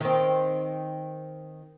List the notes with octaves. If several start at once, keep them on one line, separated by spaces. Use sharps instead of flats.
D#3 C4